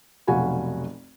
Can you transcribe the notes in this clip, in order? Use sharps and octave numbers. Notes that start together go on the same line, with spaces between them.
F1 B1 F#4 F5 G#5 B5